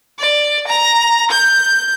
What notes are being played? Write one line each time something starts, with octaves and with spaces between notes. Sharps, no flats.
D5
A#5
G6